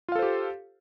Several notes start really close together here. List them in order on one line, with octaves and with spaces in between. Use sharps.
F4 F5 A4 C5 G4